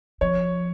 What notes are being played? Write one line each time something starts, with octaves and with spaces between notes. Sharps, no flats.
F3 C#5